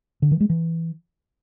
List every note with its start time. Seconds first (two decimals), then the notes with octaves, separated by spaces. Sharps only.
0.22 D3
0.31 E3
0.40 G#3
0.50 E3